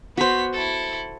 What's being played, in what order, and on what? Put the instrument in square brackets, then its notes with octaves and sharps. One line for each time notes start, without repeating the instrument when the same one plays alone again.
[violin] B3 B6 [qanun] F#4 C5
[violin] E4 A4